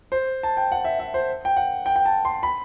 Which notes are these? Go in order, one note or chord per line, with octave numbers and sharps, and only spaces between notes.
C5
A5
G5
F#5
E5
E5
C5
G5
F#5
G5
G5
A5
C6
B5